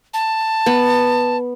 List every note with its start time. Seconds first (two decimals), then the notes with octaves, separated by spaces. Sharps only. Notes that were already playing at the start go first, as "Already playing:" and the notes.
0.14 A5
0.66 B3